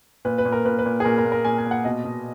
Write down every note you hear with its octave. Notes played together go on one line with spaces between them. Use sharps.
A#2 B4
B4
A#2
A#4
A#2 B4
B4
A#2
G#4
A#2 A#4
A#4
A#2
A#4
A#2 G#5
G#5
A#2
F#5
B2 D#5
B2